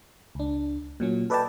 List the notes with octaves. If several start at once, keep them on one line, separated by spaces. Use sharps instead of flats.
C#2 D4
A#2 F#3 C#4
A4 B4 D5 D#5 G5 A5